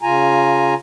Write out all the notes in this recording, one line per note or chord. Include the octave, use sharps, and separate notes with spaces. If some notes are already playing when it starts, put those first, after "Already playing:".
C#3 F4 G#5 A#5